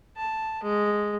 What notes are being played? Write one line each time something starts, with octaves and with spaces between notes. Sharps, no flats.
A5
G#3